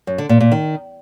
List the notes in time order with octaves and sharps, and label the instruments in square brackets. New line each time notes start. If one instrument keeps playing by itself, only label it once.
[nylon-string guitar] F#2
D3
A#2
A#2
D#3